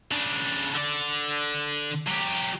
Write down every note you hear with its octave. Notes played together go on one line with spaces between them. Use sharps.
C#3 D4
D3 D5
F#3 G4